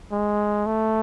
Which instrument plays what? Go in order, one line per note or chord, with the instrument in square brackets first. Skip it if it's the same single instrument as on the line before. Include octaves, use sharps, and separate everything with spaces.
[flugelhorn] G#3
A3